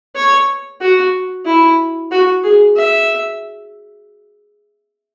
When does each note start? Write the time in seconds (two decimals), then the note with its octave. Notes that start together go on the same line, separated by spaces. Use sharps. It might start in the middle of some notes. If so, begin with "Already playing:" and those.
0.16 C#5
0.81 F#4
1.46 E4
2.11 F#4
2.44 G#4
2.77 E5